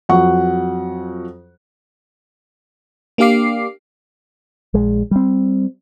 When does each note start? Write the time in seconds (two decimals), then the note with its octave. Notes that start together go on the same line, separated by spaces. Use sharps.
0.09 F2 F#3 F#5 C#6
3.18 A#3 D4 G4 F5 D6 C7
4.74 A#1 G#3
5.11 G3 C4